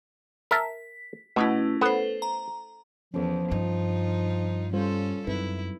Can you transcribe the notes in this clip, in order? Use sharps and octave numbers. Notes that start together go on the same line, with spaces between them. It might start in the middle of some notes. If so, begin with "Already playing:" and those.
A#4 E5 A5 B6
B2 A3 C#4 E4
B3 A4 C5
A#5
E2 F3 C#4 A4
G2 D#4 F4
G3 C#4 F4 A4 C5
F#2 C4 D#4 E4 B4